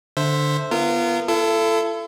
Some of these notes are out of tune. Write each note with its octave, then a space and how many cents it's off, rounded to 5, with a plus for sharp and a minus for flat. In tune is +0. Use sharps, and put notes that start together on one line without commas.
D3 +0 C5 +0 E5 +0
B3 -10 F4 -30 A#4 -30
E4 +45 A4 +5